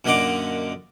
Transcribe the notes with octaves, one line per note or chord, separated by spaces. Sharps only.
F#2 A#2 D3 D#5 F#5 D6